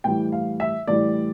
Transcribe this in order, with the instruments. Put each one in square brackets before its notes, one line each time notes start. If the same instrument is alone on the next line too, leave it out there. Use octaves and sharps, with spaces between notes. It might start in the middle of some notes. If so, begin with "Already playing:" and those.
[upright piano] A2 E3 G3 G5
F5
E5
A2 E3 G3 D5